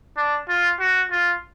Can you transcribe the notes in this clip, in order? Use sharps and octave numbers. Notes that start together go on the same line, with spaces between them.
D4
F4
F#4
F4